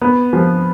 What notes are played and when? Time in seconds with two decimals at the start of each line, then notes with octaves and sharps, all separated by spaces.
0.02 B3
0.33 F3